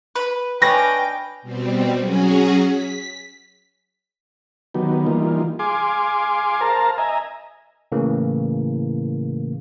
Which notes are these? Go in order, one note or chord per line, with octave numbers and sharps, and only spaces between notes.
B4 B5
D4 B4 C#5 D#5 F5 G5 G#5 A#6
B2 G3 C4
F#3 C#4 F#4 G#4
B6
D#3 F#3 B3 G4
E3 G3 A#3 D#4 F4
G#4 F5 G#5 C6 D6
A#4 C5 F5 A5 A#5
D#5 E5 G#5 A#5
A2 C#3 E3 A#3